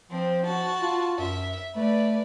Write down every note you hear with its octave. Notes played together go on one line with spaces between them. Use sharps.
F3 C4
F#4 A5
F4
F#2 E5
A3 B4 D5